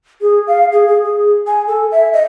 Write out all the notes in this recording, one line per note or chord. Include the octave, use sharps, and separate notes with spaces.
G#4
F5
G#4
G#4
G#4
G#5
A4
E5
D#5